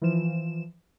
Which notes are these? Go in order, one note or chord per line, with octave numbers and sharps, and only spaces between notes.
E3 F3 E7